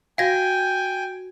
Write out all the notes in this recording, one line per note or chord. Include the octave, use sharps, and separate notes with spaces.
F#4 F5 G5 G#5 G#6 A#6 D7